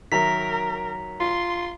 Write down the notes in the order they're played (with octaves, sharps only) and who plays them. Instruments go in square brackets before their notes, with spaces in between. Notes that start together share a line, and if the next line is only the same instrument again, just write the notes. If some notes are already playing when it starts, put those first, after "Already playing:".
[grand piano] D#3 F#3 E5 [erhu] A#4 [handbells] A#5 B6
[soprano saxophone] F4 [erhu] C6